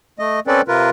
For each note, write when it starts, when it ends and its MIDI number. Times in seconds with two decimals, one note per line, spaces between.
0.19 0.40 57
0.19 0.40 75
0.47 0.61 60
0.47 0.61 61
0.47 0.61 69
0.47 0.61 71
0.47 0.61 74
0.68 0.90 48
0.68 0.90 65
0.68 0.90 70
0.68 0.90 71